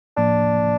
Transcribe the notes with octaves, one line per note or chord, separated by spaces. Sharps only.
A2 F3 A#3 D4